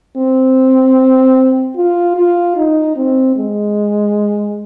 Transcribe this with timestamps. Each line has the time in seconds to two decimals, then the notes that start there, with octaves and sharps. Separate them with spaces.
0.17 C4
1.76 F4
2.16 F4
2.56 D#4
2.96 C4
3.36 G#3